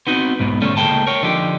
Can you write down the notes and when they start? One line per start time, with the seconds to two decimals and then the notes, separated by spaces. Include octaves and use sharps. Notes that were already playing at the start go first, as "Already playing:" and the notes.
0.07 B3 C4 D#4 F#4
0.40 B1 G#2 B3
0.62 D3 G3 A3 C#4 A4
0.77 C#2 G#3 A#3 A4 G5 A5
1.07 A#4 C#5 G5
1.23 D3 F3 D#4 G4